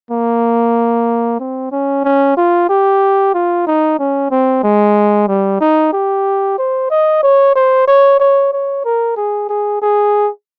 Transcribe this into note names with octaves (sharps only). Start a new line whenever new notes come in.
A#3
C4
C#4
C#4
F4
G4
F4
D#4
C#4
C4
G#3
G3
D#4
G4
C5
D#5
C#5
C5
C#5
C#5
C#5
A#4
G#4
G#4
G#4